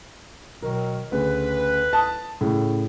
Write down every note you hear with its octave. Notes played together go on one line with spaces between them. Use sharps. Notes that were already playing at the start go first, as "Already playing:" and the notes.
B2 D#3 F#3 A#4
D2 C#3 B4
A5 D#6
A2 C#3